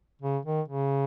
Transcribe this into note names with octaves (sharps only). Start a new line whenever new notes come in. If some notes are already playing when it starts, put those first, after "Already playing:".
C#3
D#3
C#3